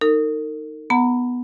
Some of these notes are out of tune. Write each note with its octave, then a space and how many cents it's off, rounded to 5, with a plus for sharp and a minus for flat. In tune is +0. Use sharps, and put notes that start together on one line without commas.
D#4 +0 A#4 -40
B3 +0 F#5 -5 A#5 -20